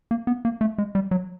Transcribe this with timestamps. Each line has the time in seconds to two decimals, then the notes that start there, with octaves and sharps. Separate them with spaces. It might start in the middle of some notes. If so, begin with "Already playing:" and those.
0.11 A#3
0.27 B3
0.45 A#3
0.61 A3
0.78 G#3
0.95 G3
1.11 F#3